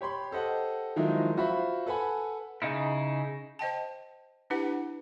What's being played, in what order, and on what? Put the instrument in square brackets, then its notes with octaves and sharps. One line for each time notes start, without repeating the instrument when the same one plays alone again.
[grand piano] G4 C#5 B5 C6
G4 A4 C5 D#5 F#5
D#3 F3 F#3 G#3 D#4 E4
F4 F#4 C5 E5 B5
A4 B4 F#5 G#5 B5
[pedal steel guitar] C#3 D#4 E4
[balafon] C5 D#5 G5 A5
D4 E4 G4 B4 F#5